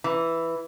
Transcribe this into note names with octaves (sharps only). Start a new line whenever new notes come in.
E3